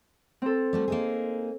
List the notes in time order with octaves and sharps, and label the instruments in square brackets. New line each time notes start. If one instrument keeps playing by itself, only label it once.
[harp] C4 A4
[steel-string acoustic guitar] G3 A3 F#4
A#3 D#4 G#4